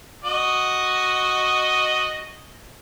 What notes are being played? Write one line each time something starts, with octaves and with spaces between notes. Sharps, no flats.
F#4 D#5